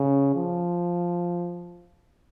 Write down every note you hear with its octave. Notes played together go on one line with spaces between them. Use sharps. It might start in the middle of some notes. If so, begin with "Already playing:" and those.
Already playing: C#3
F3